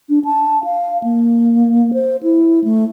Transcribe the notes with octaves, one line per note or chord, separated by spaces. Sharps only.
D4
A5
F5
A#3
C5
E4
A3